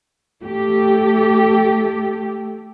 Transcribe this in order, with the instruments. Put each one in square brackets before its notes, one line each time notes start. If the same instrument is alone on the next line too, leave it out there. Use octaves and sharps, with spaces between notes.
[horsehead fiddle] A3 [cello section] G4